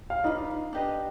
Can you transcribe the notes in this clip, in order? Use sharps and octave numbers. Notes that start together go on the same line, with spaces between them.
F5
D4 D#4 F4 B4 D#5
D4 G4 B4 D#5